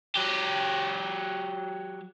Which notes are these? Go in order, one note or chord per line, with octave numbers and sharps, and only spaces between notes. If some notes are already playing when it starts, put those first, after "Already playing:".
F#3 G4